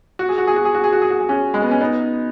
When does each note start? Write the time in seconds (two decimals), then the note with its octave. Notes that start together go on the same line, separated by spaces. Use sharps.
0.19 F#4
0.29 G#4
0.38 F#4
0.47 G#4
0.56 F#4
0.65 G#4
0.75 F#4
0.84 G#4
0.92 F#4
1.02 G#4
1.10 F#4
1.20 G#4
1.29 C#4 F#4
1.54 G#3
1.62 B3
1.71 C#4
1.81 B3 D#4